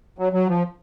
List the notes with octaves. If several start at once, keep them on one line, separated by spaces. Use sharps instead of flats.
F#3
F#3
F3